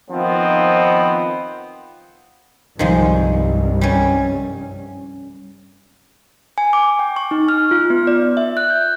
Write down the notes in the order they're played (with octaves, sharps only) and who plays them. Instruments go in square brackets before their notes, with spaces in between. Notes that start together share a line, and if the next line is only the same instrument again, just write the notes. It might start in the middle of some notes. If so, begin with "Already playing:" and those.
[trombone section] D#3 F3 B3 C4 D#4
[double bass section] C2 G2 [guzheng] D#3 F3 G#3
[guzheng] G3 C#4
[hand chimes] G#5
D6
G5
C#6
D#4
F6
F4
B3
D5
E5
F#6
G6